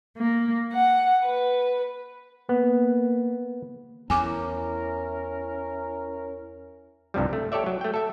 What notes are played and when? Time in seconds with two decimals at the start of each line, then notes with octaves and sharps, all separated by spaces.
0.16 A#3
0.73 F#5
1.24 B4
2.49 A#3 B3
4.10 E2 C#4 E4 A#4 G#5 D6
7.14 C2 G2 C3 F3 G3
7.33 A3
7.52 G4 A4 C#5 D5 E5
7.66 F#3
7.81 A3 G5
7.94 A4 E5